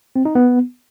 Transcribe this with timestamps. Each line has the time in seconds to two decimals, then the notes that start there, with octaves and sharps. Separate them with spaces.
0.16 C4
0.25 D#4
0.35 B3